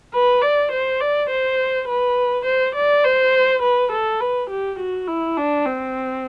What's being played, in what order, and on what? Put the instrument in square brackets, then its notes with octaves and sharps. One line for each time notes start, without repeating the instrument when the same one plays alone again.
[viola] B4
D5
C5
D5
C5
B4
C5
D5
C5
B4
A4
B4
G4
F#4
E4
D4
C4